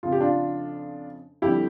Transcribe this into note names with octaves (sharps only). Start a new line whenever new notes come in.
F2 C#3 F3 F4
G4
D4 F4
F2 D3 G3 E4 G4